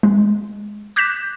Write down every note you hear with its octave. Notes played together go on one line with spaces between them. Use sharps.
G#3
D6 F#6 G6 A#6 B6 E7